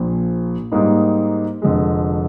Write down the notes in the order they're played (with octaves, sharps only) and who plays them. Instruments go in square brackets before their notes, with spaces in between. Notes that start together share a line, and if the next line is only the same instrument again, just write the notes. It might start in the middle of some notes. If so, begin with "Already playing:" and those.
Already playing: [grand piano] A#1 A#2 F3
G#2 G3 A#3 D#4
F1 F2 D3 G#3